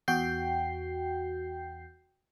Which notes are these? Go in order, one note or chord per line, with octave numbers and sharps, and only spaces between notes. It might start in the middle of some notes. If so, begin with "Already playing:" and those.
E2 F#4 G5 G6 C7